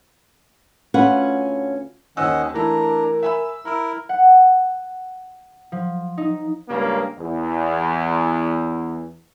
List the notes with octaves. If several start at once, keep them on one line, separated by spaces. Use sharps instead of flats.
D2 C#4 F4 B4 F#5
D#2 D#3 C#4 C5 D#5 F#5 E6
E3 A3 D4 E4 A#4 A#5
E5 G#5 B5 E6
E4 A#4 A#5 E6
F#5
F3
D#4
C#2 G2 C#3 A#3
E2